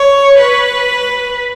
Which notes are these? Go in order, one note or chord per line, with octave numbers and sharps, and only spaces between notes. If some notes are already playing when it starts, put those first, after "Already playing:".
Already playing: C#5
B4